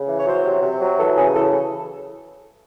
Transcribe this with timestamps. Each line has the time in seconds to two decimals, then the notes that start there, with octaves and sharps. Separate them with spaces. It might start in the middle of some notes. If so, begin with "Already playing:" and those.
Already playing: C#3
0.08 E3
0.18 C#5
0.26 F#3 C5
0.44 C3
0.62 C3
0.80 F#3
0.98 E3 A4
1.16 C#3 G#4
1.34 E3 A4